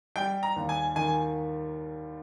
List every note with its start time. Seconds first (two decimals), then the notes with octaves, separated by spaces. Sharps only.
0.16 G3 G5
0.43 A#5
0.56 D#2
0.69 G#5
0.96 D#3 G#5